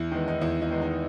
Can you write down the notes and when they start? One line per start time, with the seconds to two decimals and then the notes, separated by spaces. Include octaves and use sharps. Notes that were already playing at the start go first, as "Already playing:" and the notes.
Already playing: E2 E4
0.12 D#3 G#3 B3
0.28 D#4
0.41 E2 E4
0.62 E4
0.71 D#3 G#3 B3
0.82 D#4